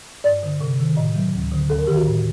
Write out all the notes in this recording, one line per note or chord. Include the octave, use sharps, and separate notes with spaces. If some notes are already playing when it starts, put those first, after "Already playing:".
G2 D5
D3
C3
D#3
A2 D#5
F#3
D2
D3
D#2 A4
A#4
D#3 G4
F#4
A2